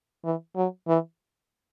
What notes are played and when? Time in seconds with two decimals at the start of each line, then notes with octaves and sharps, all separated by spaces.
0.25 E3
0.56 F#3
0.88 E3